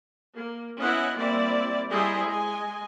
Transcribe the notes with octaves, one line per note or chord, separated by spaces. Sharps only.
A#3
B3 C#4 E4 D#5 F#5
G3 A#3 C4 E4 D5
G3 E4 G#4 C5 D#5 A#5
G#3 D#5 G#5